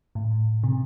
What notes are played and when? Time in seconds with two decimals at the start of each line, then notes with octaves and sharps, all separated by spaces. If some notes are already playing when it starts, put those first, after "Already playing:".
0.15 A2
0.63 C3